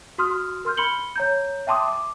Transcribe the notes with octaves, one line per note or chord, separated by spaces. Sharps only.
F#4 C6 D#6 F6
A#4 C6 F6 G6
B5 C6 C#7 F#7 G7
C#5 A#5 G6
E5 G5 A5 C6 D6 D#6
D6